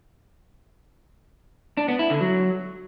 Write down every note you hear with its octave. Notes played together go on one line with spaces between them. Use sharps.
D4
B3
E4
D3
F#3